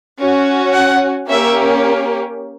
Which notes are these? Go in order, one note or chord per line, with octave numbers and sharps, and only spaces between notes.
C#4 F#4
F#5
A#3 C#4 G4 E5